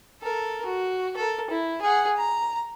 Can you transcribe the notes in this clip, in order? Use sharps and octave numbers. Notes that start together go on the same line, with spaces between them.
A4 A#4
F#4
A4 A#4
E4
G#4 F#5
A#5